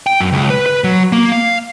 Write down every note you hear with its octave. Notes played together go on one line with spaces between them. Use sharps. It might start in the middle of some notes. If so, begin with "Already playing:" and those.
G5
F#2
C#2
B4
B4
F#3
A#3
F5